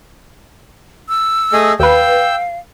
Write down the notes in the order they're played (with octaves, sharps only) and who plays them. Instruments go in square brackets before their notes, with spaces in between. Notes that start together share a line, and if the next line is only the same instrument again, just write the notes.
[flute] E6
[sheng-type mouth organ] A3 G#4 D#5
[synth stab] D#2 B4 [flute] F5 [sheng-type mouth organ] G5 E6